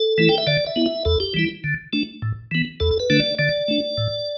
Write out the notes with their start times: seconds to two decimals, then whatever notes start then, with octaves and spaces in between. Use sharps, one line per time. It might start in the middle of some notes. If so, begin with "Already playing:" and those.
Already playing: A4
0.18 E3 A3 E4
0.29 G5
0.38 E5
0.47 D3 D5
0.66 E5
0.76 B3 E4
0.86 E5
1.05 E2 A4
1.20 G4
1.34 E3 G3 E4
1.64 D3
1.93 A3 D4
2.22 A2
2.51 E3 B3
2.80 E2 A4
3.00 B4
3.10 D3 A3 D4
3.20 D5
3.39 D3 D5
3.68 A3 D4
3.98 A2